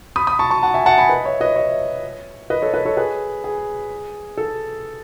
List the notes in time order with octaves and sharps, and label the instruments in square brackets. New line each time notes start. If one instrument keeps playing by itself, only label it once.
[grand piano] B5 D#6
B5 D#6
A5 C#6
A5 C#6
F#5 A5
E5 G#5
F#5 A5
G#5 B5
B4 D#5
C#5 E5
B4 D#5
C#5 E5
B4 D#5
A4 C#5
B4 D#5
A4 C#5
G#4 B4
G#4
A4